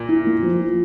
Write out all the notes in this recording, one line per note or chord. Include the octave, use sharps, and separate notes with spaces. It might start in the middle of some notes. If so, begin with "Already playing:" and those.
Already playing: A#2
E4
A#3
F3